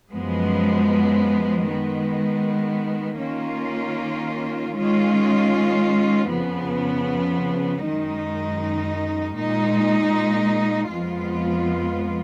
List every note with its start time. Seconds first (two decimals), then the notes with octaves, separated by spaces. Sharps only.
0.11 F#2 F3 G#3 B3
1.66 D#3 G#3 B3
3.20 D#3 A#3 C#4 F4
4.74 D#3 G#3 C#4 F4
6.29 F2 C#3 F3 B3
7.82 F#2 D#3 G#3 D#4
9.36 A#2 G#3 D#4
10.90 F2 F3 G#3 B3 F4